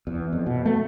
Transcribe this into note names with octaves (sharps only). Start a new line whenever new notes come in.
E2
F2
B2
A3